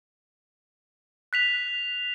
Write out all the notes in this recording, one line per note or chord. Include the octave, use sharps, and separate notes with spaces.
F#6 B6 F7